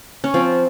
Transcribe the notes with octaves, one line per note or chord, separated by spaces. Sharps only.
C#4
F3 C4